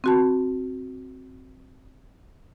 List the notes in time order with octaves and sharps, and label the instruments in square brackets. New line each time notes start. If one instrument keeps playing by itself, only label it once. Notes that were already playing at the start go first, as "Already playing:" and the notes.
[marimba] C4 F#4 A5